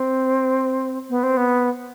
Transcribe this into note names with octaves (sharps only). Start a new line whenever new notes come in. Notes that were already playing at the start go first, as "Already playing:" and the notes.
Already playing: C4
B3
C4
B3